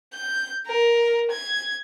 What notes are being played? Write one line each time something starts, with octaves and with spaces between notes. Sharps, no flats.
G6
A#4
G#6